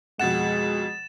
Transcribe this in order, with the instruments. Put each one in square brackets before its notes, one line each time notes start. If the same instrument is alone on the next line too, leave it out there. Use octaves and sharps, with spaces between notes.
[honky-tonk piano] F2 B2 F#5 [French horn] G#3 [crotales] A6 E7